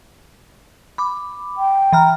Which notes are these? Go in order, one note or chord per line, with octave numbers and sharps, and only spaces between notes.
B5 D6
G5
E3 A#5 F6